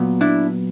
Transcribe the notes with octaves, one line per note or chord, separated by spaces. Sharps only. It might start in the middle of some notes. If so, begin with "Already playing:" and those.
Already playing: A#2 F#3 B3
D4 E4